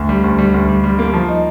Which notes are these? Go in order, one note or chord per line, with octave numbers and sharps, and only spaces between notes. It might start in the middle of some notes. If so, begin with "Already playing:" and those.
Already playing: D2
G3
D2
G3
D2
G3
G3
A#3
F3
D#4